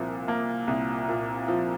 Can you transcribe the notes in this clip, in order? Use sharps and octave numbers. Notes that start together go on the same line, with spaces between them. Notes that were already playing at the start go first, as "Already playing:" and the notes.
Already playing: C2 A#2 F3
A#3
C2
A#2
F3